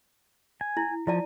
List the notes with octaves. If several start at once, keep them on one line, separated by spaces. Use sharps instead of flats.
G#5
E4
F3 E4 D5 A5